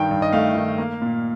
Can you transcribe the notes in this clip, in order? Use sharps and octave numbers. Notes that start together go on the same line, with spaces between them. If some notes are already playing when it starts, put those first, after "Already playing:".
Already playing: G2 D#3 G5
G2
D#5
A3 F5
D#3
A#3
A#2